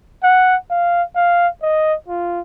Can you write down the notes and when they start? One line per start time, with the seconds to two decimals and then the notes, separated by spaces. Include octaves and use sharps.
0.24 F#5
0.71 F5
1.16 F5
1.62 D#5
2.09 F4